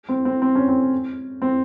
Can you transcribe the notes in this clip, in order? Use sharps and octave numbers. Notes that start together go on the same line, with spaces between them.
C4
C4
C4
C#4
C4
C4